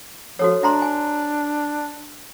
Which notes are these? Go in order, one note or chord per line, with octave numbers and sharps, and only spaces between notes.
F3 F#4 A4 C#5
D4 E5 A#5 C6
G#5